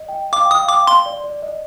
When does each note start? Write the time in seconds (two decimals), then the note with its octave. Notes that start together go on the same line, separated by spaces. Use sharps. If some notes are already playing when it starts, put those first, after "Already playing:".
Already playing: D#5
0.08 G5
0.32 F5 D6
0.45 G5
0.51 D#6
0.58 F5
0.68 G5 D6
0.82 F5
0.87 C6
1.06 D5
1.24 D5
1.42 D#5